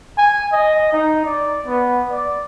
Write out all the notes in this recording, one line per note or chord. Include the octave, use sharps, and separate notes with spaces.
G#5
D#5
D#4
D5
B3
D5